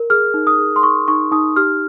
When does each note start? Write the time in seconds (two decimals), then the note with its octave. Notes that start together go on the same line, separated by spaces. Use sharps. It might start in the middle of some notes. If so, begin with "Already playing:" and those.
Already playing: A#4
0.10 G#4 F6
0.34 D#4
0.47 D#6
0.59 G#4
0.76 C6
0.83 D#4 C#6
1.08 D#4 C#6
1.32 D#4 D#6
1.56 G4 F6